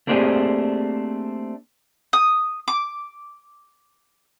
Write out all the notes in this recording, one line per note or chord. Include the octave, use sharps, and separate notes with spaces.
A3 A#3 C4 D4 G4 G#4
D#6
D6